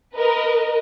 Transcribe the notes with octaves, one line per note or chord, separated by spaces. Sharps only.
A#4 B4 D#5